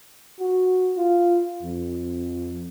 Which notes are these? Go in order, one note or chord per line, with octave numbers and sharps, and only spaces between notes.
F#4
F4
F2